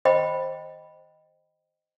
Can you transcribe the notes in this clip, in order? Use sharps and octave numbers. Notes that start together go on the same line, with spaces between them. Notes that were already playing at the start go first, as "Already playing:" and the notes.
C5 D#5 G5 B5